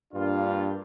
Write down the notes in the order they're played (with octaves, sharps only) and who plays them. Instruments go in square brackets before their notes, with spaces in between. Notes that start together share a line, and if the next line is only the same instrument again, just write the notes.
[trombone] G2 [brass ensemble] A#3 D4 F4